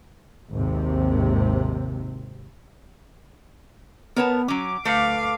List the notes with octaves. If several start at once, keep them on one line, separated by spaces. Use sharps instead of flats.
G#1 D#2 C3
B3 A#4 C#5 A5
F#3 C#4 D6
D2 A3 B4 F5